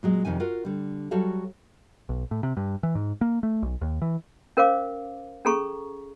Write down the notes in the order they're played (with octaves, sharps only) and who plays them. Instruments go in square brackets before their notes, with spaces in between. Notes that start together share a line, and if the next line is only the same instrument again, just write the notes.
[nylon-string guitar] A#2 F#3 G#3
F2 C3 D#3 G#5
F4 F#4 A#4 F#5
D3 G3
F#3 G3 F#4 A4 C#5 F5
[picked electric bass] B1
A2
C3
G2
E3
G#2
A#3
A3
B1
D#2
E3
[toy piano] C#4 A#4 C5 F5 D6
C#4 G#4 A4 A#5 C#6